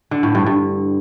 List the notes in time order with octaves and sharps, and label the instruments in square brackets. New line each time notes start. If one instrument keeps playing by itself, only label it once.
[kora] D3
A2
G2
G2